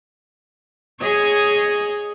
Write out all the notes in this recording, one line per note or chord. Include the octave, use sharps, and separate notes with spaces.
G#4 C#5 D#5